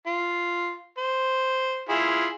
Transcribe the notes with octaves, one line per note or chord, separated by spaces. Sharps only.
F4
C5
E4 F4 G#4